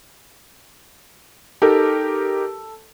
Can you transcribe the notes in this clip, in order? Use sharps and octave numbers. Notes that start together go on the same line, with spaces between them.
D#4 G4 A4 A#4